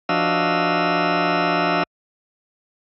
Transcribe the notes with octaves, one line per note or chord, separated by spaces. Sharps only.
F3 D4 F#4 D#5 F5 E6